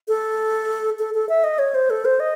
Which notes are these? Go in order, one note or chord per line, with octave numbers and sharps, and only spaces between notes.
A4
A4
A4
E5
D#5
C#5
C5
A4
C5
D#5